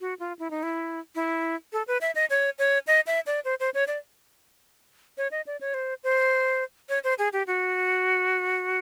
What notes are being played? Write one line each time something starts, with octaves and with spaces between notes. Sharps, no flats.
F#4
F4
E4
D#4
E4
E4
A4
B4
E5
D#5
C#5
C#5
D#5
E5
D5
C5
C5
C#5
D5
C#5
D#5
D5
C#5
C5
C5
C#5
C5
G#4
G4
F#4